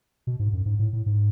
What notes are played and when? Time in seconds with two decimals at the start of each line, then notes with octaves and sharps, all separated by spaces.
0.27 B2
0.39 G#2
0.53 F#2
0.66 G#2
0.79 A2
0.93 A2
1.06 G#2